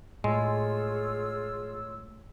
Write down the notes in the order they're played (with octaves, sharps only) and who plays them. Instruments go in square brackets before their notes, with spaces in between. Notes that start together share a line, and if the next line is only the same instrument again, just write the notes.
[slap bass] A2 [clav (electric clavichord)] G#3 [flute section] F4 C#5 E6 [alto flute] G#4